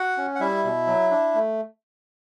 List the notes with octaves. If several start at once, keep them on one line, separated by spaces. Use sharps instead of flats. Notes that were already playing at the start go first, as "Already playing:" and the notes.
Already playing: F#4 F#5
C#4
F#5
G3 E4 E5
B2
F#3
D4
A3